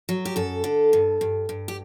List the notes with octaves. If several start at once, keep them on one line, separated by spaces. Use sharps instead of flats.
F#3
G4
F#2 A4
D3
G2
G2
G2
G4